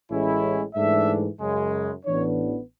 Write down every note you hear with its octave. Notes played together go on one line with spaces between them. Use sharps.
A1 A2 G#3 C#4 E4
G#2 E3 A3 D4 E5
F#2 C#3 G#3
A1 A2 E3 B3 D4 C#5